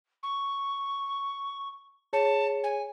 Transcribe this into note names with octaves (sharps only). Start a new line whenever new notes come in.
C#6
G#4 C#5 A5 C#7
G#5